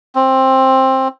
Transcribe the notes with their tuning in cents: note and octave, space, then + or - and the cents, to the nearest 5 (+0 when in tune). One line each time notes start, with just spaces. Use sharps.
C4 +15